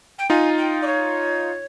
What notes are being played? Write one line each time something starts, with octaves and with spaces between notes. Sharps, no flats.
G5
D#4 F4 G#5
G5
D5
C#5